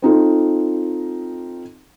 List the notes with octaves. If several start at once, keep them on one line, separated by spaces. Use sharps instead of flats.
C4 D#4 F4 A4